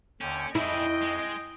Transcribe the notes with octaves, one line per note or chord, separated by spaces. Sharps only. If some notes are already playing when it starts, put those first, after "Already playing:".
D#2 D3 C#4 G5
F2 D4 E4 G#4 D#5 G5
G#3